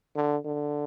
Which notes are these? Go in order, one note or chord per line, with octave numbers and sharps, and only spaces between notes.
D3
D3